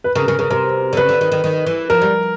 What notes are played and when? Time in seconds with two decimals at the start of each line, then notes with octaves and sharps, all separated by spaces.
0.04 B4
0.15 C#3 A#4
0.28 C#3 A#4
0.39 C#3 A#4
0.51 C3 A#4
0.93 D3
0.97 C#3 B4
1.09 D3
1.21 D#3
1.32 D#3
1.44 D#3
1.66 E3
1.90 F3 A#4
2.02 G3